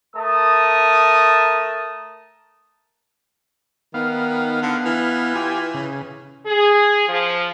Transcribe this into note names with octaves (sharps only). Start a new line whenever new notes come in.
A3 A#4 A5 D#6
D#3 B3 F5
D3
E3
F4 G4 G#5
C#3
G#4
F3